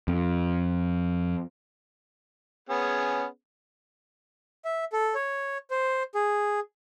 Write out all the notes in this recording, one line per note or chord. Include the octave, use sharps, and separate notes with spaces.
F2
B3 C#4 G#4
E5
A4
C#5
C5
G#4